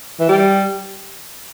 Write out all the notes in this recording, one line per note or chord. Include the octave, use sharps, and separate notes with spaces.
E3
G3